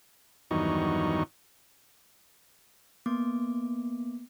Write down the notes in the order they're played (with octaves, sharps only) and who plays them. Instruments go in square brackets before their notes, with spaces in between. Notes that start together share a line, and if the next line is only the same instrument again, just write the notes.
[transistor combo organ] E2 G2 D#3 F#3 D#4 C#6
[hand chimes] A#3 B3 D6